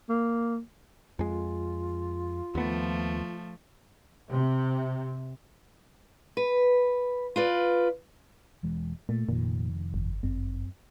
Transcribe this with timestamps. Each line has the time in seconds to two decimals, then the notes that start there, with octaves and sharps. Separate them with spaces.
0.09 A#3
1.19 F2 G#3 F4
2.55 D#2 F3 A3 B3
4.30 C3
6.37 B4
7.36 F4 B4 D5
8.63 E1 E3 G#3
9.09 A#2 A3
9.29 F1 F2 A#2 D#3
9.94 G1
10.23 G1 F#2 C4